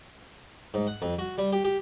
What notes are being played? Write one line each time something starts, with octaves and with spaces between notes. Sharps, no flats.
G#2
F#5
F2
F#4
G3
G4
G4